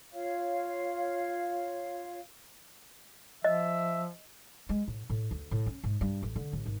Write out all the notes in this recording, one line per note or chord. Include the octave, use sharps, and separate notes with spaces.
F4 C#5 F5
F3 D#5 E5
G#3
A2
A2
D2
A2
C#4
G#2
G2
A1
D3
A1
G#1